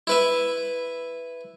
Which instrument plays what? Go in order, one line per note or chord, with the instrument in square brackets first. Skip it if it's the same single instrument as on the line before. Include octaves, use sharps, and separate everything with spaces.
[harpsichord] E4 B4 E5